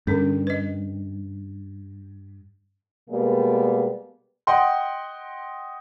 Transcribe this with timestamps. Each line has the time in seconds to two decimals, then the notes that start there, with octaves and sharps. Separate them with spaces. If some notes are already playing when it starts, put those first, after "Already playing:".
0.07 G2 D3 C#4 A4
0.47 B4 D#5
3.10 B2 G3 G#3 A#3 B3
4.47 D#5 F#5 G5 C6